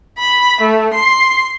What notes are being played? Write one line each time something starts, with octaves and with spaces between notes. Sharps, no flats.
B5
A3
C6